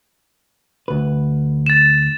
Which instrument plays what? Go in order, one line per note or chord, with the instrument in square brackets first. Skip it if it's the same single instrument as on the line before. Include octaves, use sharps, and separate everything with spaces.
[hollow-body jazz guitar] D2 B4
[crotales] A6 E7